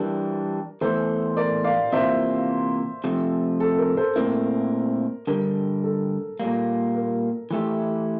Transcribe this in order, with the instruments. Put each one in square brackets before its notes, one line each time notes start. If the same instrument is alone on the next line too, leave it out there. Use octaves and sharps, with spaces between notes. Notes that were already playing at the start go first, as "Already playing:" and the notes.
Already playing: [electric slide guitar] E3 G3 D4 [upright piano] A#4
[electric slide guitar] E2 E3 A3 [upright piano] A4 C5
[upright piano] A#4 D5
D5 F5
[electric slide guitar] C3 E3 A#3 F4 [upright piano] C5 E5
[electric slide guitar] C3 F3 A3
[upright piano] A4
A#4
A4 C5
[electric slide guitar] A#2 A3 C4 E4 [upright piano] A#4
[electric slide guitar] G2 D3 G3 [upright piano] A#4
[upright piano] A4
[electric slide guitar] A#2 G3 A#3
[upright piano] A#4
[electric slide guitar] E3 A3 E4 G4